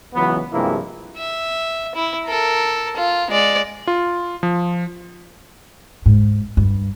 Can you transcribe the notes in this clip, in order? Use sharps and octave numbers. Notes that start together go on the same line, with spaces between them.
C#2 E3 F#3 B3
G2 C3 F3 G#3 A#3 E4
E5
E4
A4 A#4
F4
G#3 D5
F4
F3
G#2
G2